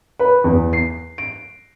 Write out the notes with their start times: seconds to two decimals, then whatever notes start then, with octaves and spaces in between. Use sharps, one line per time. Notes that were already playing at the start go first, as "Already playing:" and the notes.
0.19 B4
0.44 E2
0.73 C7
1.18 D7